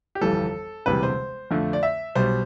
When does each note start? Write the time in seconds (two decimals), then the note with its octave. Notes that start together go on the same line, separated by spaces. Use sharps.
0.15 G4
0.21 G1 F2 E3 G3 A4
0.86 E1 D2 C3 E3 G3 B4
1.03 C5
1.51 F2 D3 F3 A3
1.73 D5
1.83 E5
2.15 B1 B2 G3 C5